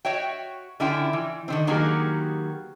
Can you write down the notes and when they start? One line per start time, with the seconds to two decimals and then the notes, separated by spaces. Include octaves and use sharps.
0.05 F#4 C#5 E5 G5
0.80 D3 C#4 E4 F4 G5
1.13 E3
1.48 D3 D#3 C4
1.67 D#3 F#3 A#3 B3 G4 G#4